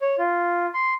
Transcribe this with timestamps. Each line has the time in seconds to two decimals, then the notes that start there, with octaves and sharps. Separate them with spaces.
0.01 C#5
0.18 F4
0.74 C6